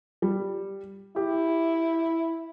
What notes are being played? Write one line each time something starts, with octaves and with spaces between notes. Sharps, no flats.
G3
E4 G4